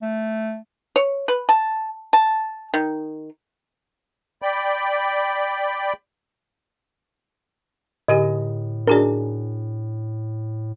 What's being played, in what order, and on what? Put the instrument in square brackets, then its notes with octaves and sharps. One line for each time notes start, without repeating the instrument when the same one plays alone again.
[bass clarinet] A3
[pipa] C#5
B4
A5
A5
D#3
[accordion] D5 G5 B5
[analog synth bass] A2 [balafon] D3 G4 G#5 [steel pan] D#5
[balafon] D4 F#4 D5 [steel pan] G#4 A#4